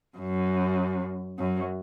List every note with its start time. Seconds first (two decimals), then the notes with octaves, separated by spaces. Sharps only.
0.17 F#2
1.39 F#2